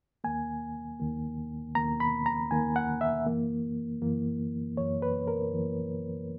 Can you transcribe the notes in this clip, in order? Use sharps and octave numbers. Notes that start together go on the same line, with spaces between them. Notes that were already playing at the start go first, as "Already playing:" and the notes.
D#2 D#3 A#3 G#5
D#2 D#3 A#3
D#2 D#3 A#3 A#5
B5
A#5
D#2 D#3 A#3 G#5
F#5
E5
F#2 E3 A#3
F#2 E3 A#3
F#2 E3 A#3 C#5
B4
A#4
F#2 E3 A#3